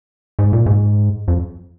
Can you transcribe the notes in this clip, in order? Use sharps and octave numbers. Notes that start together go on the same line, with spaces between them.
G#2
A#2
G#2
F2